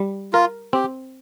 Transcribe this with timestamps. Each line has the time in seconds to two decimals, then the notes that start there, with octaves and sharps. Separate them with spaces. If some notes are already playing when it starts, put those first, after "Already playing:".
Already playing: G3
0.33 F4 A#4
0.73 C4 G4